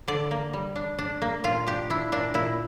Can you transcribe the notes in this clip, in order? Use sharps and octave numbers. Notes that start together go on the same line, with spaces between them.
D3 D5
A#3
G3
D4
D4
A#3
A#2 F4
D4 G4
D4 E4
A#2 D4
A#2 E4